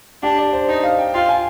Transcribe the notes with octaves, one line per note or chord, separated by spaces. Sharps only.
D4 G4
D5
C5
D#4 D#5
F5
G5
F4 G5
G#5